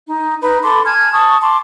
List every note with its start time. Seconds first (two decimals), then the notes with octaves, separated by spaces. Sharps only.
0.08 D#4
0.42 D#4 B4 B5
0.63 A4 B5 C6 D6
0.85 G#5 A5 F6 G#6
1.13 A5 C#6 D#6
1.42 A5 C6 D6